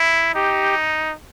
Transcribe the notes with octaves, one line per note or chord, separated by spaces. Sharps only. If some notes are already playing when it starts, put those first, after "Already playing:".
Already playing: E4
D#4 G4